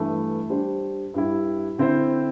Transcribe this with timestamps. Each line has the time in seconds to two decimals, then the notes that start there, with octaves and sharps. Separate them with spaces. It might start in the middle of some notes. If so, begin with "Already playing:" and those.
Already playing: G2 E3 A3
0.50 G3 D4 C5
1.14 G2 G3 E4
1.78 D3 C4 E4 C5